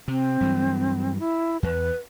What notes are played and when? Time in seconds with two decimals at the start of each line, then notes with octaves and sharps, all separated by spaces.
0.08 C3 C4
0.41 G2 E3 F#3
1.19 E4
1.63 E2 B4